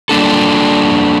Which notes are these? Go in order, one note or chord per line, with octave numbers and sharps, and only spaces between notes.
G3 A#3 D4 A4